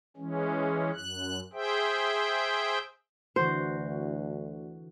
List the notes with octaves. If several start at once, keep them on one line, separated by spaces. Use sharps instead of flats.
E3 G#3 C#4
F#2 F#6
G#4 C5 E5 G5
D2 D3 E3 F#4 C5